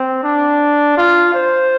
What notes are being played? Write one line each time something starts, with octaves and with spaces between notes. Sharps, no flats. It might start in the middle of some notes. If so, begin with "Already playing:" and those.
Already playing: C4
D4
F4
C5